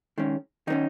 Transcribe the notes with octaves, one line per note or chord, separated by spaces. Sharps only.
D#3 G#3 C#4
D#3 A#3 C#4 D#4